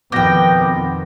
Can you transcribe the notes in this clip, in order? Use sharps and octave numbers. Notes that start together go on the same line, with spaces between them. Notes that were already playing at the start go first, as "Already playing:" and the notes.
F2 B2 D#3 B3 G5 D6 G6 A#6